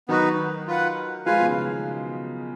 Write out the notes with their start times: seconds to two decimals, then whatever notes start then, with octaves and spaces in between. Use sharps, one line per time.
0.08 D#3 F#3 B3 D#4 F#4 B4
0.67 F4 B4 F#5
1.26 F3 G#3 F4 B4 F5 G#5
1.40 B2
1.46 C#3